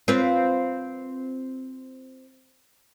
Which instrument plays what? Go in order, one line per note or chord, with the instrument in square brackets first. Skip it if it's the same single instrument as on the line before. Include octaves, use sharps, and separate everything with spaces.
[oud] C4 F4 B4